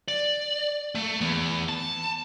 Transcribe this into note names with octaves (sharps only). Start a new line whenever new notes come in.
D5
A3
E2
A5